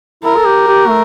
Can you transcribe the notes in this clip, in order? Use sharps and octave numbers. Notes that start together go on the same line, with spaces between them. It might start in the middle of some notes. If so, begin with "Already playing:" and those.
E4 A#4
A4
G4
G4
A3